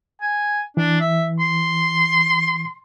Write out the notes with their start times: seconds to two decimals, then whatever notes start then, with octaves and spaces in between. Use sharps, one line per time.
0.21 G#5
0.77 E3 D4
1.00 E5
1.40 C6